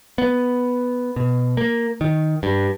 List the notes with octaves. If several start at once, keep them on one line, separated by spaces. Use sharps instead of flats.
B3
B2
A#3
D#3
G2